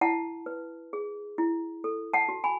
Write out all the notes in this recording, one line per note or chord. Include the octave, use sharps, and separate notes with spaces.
E4 F#5 A5
B4
G#4
E4
A4
F#5 A5
F#4
G#5 B5